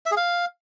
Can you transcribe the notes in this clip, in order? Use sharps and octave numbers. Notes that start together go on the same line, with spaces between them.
E5
G#4
F5